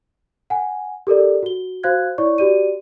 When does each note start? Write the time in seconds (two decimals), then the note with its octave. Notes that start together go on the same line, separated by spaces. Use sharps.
0.50 F#5 G#5
1.07 G4 A4 A#4 D5
1.43 F#4 G7
1.83 F#4 C5 F5 F#6 G#6
2.18 E4 C#5 D5 C#6
2.38 F#4 G4 D5 D#7